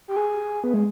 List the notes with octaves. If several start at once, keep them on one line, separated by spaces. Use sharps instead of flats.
G4
G#4
B3
G#3